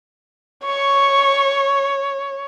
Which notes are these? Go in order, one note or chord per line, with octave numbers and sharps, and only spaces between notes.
C#5 C#6